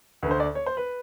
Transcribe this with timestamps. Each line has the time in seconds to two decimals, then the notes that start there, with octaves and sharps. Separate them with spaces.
0.23 D2 B4
0.27 D3 C5
0.40 D5
0.55 C#5
0.66 C5
0.77 B4